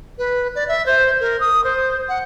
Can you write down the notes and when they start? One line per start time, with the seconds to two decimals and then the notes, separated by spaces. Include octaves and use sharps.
0.18 B4
0.55 D5
0.68 E5
0.86 C5
1.21 A#4
1.40 D#6
1.64 C5
2.09 F#5